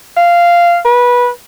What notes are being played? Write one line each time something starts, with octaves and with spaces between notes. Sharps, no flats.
F5
B4